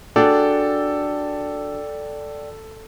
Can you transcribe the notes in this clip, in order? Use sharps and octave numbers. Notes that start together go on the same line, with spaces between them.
D4 F#4 G#4 A4 D5 G5